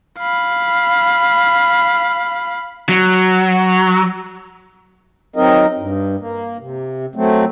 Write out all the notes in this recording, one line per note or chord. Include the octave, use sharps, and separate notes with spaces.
F5 B5
F#3
F#3 C4 D#4 A#4 D#5
G2
A#3
C3
F#3 A3 C4